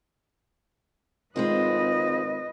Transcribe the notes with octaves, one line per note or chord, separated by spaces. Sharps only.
G#1 G#3 C4 F4 B4 D#5